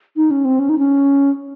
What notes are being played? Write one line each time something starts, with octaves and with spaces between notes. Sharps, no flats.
D#4
C#4
C4
C#4
D#4
C#4